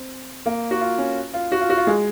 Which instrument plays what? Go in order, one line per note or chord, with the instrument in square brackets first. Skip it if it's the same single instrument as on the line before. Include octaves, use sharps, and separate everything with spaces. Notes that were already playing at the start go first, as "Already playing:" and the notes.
Already playing: [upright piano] C4
A#3
F#4
F4
C#4
F4
F#4
F4
F#4
F4
G#3